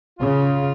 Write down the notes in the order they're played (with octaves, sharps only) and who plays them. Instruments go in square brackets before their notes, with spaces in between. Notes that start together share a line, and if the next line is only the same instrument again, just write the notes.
[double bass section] C#3 [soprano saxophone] F4